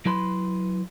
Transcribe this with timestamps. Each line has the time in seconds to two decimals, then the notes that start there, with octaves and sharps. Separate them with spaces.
0.06 F#3 E4 B4 B5 C6